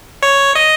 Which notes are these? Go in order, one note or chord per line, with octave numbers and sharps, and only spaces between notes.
C#5
D#5